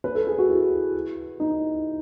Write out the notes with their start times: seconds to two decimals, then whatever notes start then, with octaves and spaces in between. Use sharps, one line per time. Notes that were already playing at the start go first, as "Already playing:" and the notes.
0.04 B4
0.15 A4
0.27 G#4
0.38 F#4
0.49 E4
1.40 D#4